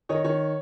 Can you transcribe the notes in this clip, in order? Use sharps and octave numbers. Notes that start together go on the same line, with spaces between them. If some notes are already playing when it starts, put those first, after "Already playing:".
D#3 C#5 D#5
D#3 C#5